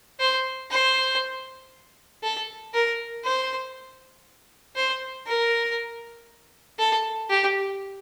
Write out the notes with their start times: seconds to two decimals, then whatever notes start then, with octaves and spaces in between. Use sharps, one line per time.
0.20 C5
0.71 C5
2.23 A4
2.73 A#4
3.24 C5
4.76 C5
5.27 A#4
6.79 A4
7.30 G4